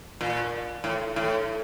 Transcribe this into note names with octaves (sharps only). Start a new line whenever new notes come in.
A#2
A2
A2